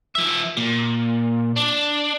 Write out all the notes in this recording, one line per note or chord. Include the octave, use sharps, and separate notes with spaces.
F3 E5
A#2
D4